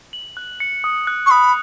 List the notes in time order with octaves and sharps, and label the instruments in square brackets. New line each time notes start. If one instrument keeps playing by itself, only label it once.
[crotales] F#7
F#6
C#7
D#6
F#6
[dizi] C#6
[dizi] B5 [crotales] D#6